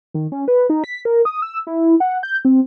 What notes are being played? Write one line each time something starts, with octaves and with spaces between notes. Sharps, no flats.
D#3
C#4
B4
D#4
B6
A#4
D#6
E6
E4
F#5
G6
C4